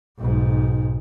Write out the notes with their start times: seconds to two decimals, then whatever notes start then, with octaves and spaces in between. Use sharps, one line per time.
0.18 B1 G#2